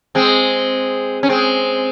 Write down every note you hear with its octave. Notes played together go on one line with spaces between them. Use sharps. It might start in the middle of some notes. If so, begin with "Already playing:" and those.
G#3 C4
C#4
G#3 C4